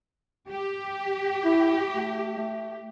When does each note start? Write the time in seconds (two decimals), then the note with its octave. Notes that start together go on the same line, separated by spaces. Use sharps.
0.50 G4
1.45 E4
1.94 A3
2.38 A3